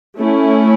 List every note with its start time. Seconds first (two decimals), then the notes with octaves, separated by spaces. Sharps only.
0.18 A3 C#4 E4